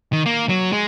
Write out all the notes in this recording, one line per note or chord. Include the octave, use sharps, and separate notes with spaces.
D#3
A#3
F#3
G#3